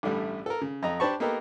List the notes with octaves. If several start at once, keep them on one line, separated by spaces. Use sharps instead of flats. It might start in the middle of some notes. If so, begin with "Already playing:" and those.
A1 G2 D3 G3 A3 E4
A4 A#4
C#3
F2 D#5 A#5
D4 G4 C5 A5 B5 C#6
A#3 B3 D#4 G4 A4 A#4